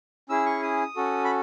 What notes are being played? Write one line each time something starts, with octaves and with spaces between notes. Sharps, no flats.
C#4 E4 G#4 E6
C#6
D#6
C#4 F#4 A4
B5